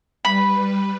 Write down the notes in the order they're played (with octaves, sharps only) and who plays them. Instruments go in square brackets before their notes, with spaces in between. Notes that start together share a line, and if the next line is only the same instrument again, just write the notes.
[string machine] G3 B4 [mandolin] B5